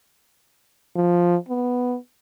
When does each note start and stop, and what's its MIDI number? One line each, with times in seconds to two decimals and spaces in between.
0.96 1.36 53
1.49 1.96 59